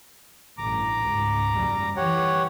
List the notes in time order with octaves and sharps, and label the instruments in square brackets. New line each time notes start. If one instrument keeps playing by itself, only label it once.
[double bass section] A1 G2 [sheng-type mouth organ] A#5 D6
[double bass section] C#2 G#2
F#1 D#2 G3
[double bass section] E3 [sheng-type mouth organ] G4 C#5 F#5